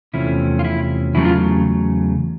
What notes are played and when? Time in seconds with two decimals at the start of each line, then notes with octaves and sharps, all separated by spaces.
0.14 E2 C3 F3 A3 C#4 E4
0.59 F4
0.64 E4
1.14 E2 C#3 F#3 A3 E4
1.25 F4